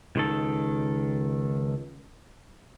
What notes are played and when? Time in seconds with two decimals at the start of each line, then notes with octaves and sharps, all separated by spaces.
0.16 C#2 D#3 A4